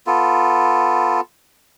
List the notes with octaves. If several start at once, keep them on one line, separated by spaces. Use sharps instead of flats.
B3 F4 A4